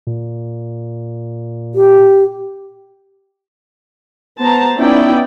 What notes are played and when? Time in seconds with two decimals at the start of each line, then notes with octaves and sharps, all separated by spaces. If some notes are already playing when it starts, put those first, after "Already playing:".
0.07 A#2
1.75 G4
4.39 B3 C5 A5 A#5
4.76 B3 C#4 D#4 E4 D5 G5